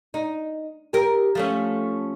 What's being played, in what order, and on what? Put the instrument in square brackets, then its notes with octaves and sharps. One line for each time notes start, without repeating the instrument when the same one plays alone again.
[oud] D#4
G4 A#4
F3 A3 C#4